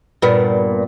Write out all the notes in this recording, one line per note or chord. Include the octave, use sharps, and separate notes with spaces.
G2 A#2 B3